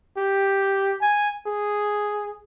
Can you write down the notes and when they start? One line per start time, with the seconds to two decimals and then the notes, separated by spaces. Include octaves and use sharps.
0.18 G4
1.02 G#5
1.47 G#4